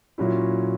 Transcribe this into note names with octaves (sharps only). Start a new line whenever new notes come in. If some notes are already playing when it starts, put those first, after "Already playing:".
A#2 F#3 C#4 E4